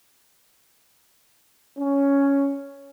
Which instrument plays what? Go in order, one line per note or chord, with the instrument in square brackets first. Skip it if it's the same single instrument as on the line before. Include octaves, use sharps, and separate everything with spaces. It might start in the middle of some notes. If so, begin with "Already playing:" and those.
[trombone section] C#4